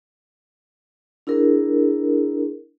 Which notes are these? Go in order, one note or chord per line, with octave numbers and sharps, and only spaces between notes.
D4 E4 G#4 A#4